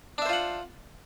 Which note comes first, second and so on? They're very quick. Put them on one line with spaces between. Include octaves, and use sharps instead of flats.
D4 E5 C5 F4 F#5